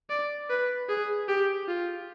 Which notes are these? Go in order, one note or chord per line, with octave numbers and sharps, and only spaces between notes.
D5
B4
G#4
G4
F4